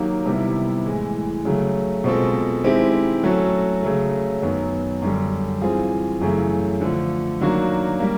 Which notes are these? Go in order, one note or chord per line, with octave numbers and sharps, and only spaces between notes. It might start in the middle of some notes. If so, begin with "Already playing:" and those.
Already playing: D#3 F#3 A#3 D#4 G4
C3 D#3 G3 B3 E4
A2 E3 G#3
C#3 F#3 A3
B2 G#3 C4 F4 A4
D#3 G#3 C4 E4 G4
F#3 A3 C#4 F#4 A4
C#3 F#3 A3
F#2 D#3 F#3 B3
F#2 D3 G3
E3 G3 C4 F4 G#4
F#2 C#3 E3 A3
D3 F3 A3
D#3 F#3 A#3 D4 F#4
G3 A#3